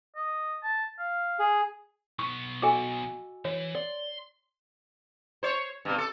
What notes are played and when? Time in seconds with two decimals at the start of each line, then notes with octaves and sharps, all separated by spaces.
0.16 D#5
0.63 A5
0.99 F5
1.39 G#4
2.19 B1 B3 C#6
2.62 F#4 A4 D#5 G#5 D6
3.45 E3 C#5
3.75 D5 C6
5.43 C5 C#5
5.85 G2 B2
5.98 A4